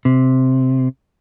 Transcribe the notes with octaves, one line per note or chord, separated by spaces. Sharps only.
C3